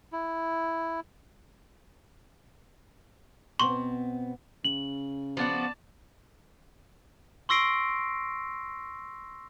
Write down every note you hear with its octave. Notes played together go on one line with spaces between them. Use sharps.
E4
B2 B3 C4 C6 C#6
C#3 F#7
F3 B3 F#4 D5 A5
C6 C#6 E6 A#6 C7 D7